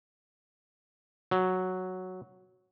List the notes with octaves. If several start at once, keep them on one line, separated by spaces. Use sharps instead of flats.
F#3